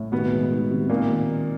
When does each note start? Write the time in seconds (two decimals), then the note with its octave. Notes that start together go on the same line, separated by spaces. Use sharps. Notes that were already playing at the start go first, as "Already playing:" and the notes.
Already playing: A2
0.12 B2 D#3 B3
0.32 G#3
0.51 D#3
0.71 C3
0.89 A#2 D#3 A#3